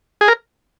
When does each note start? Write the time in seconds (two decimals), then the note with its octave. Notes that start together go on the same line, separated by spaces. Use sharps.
0.21 G#4
0.28 A#4